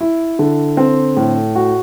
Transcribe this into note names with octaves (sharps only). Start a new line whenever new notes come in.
E4
D3
C4
A2
F#4